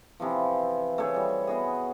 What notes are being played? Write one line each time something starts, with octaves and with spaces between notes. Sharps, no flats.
C3 E3 F3
A3 C#4 G#4 C#5
E3 G3
B3 F#4 G#4